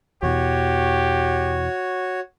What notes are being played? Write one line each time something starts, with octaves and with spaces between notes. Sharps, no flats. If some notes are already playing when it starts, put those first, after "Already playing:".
E2 B2 E3 F#4 G4 C#5